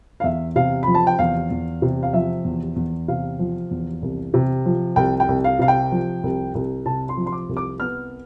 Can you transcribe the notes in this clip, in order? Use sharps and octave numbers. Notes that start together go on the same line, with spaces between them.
F5
E2 E5
C3 F5
F3 B5
A5
G5
E2 F5
E2
C3
F5
F3 E5
E2
E2
C3 F5
F3
E2
C2
C3
F3
C2 G5
G5
C2
F5
C3 F5
G5
F3
C2
C2
C3 A5
C6
F3
C6
D6
C2
D6
B3 F6